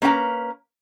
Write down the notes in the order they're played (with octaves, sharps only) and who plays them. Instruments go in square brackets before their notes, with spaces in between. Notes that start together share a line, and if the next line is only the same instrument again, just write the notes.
[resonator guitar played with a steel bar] A#3 C#4 B4 G5 A#5